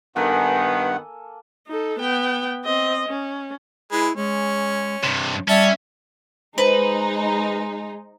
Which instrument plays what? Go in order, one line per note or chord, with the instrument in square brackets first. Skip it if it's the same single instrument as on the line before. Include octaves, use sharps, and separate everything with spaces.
[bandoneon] G2 F#5 [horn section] D#3 B3 [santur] A#3 A4 G#5
[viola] D#4 A4
B3 G5
C4 D#5
C#4
[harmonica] G#3 B4 [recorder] E4
[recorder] G#3 [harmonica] C#4
[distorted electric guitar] G2 C3
[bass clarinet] G3 [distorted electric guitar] C#4 [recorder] E5 [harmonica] A5
[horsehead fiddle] G#3 [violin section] D#4 [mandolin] B4 [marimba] C5